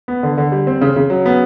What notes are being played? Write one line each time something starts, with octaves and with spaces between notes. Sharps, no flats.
B3
D3
D3
G3
C4
C#3
C#3
F#3
B3